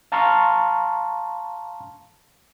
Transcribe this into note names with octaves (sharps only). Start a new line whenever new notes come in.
F5 A5 A#5 C6 C#6 F6